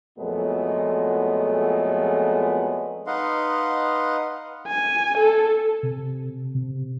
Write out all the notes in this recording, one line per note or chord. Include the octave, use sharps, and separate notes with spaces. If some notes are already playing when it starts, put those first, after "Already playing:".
F2 A#2 F#3 G#3 A3 B3
D#4 B4 D#5 F5 F#5 C6
G#5
A4
C3
C3